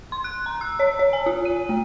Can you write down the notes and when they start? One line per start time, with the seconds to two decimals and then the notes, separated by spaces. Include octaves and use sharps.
0.12 C6
0.24 F#6
0.46 A#5
0.61 E6
0.80 C#5
0.99 C#5
1.13 G#5
1.26 F4
1.45 D#7
1.69 A3